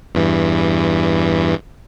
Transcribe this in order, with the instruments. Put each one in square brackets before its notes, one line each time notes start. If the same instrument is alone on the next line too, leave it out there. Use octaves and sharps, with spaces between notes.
[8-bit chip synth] E2 G2 E3